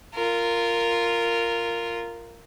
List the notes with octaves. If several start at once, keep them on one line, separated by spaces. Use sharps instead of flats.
F4 A#4